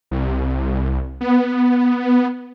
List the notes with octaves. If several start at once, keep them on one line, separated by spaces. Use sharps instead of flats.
C2
B3